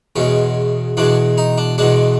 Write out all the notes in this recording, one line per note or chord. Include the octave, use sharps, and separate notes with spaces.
E2 B2 G#3 C#4
E2 B2 G#3 D4
D#4
D4
E2 B2 G#3 D4